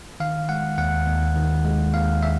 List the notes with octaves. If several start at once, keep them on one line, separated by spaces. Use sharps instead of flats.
D#3 F5
G#3 F#5
D#2 F#5
D#2
D#3
G#3
D#2 F5
E5